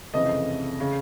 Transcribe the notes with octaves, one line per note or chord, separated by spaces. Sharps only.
F1 F2 C#3 E3 D#5
C#3